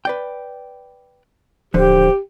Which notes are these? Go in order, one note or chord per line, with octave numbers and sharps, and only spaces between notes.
B4 D5 G5
D1 D3 F3 G4 C5